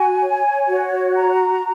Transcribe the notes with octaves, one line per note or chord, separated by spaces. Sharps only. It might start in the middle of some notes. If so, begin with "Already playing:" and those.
Already playing: F#4 G#5
C#5
F#4
A#5